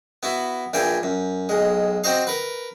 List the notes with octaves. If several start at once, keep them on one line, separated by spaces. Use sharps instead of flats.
B3 E4 F#4
A#1 E3 A#3 G5 G#5
F#2
B1 G#3
C4 F#4 C5 D#5 F5
A#4 B4